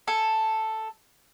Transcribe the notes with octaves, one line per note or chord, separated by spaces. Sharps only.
A4 G#5